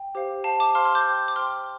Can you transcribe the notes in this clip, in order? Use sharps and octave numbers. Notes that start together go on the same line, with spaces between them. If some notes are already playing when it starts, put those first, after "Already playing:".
Already playing: G5
G4 C5 F5
C5 F5 A5
A5 D6
C5 F5 C6 F6
C6 F6
D6 G6
C5 G5
D6
C5 G5 C6 F6